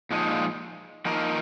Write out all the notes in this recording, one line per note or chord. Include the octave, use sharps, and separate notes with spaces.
A#2 F3 G#3 D#4
F3 A#3 D#4 A#4